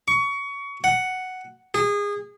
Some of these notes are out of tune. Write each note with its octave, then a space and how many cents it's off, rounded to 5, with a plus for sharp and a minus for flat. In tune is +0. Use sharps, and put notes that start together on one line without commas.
C#6 +25
F#5 +5
G#4 -25